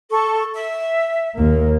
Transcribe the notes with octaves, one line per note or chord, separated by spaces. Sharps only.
A4 C#6
E5
D#2 A#3